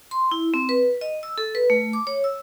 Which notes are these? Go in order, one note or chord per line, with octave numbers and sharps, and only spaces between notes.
C6
E4
C4
B4
D#5
E6
A4
B4
A3
D6
C#5
E6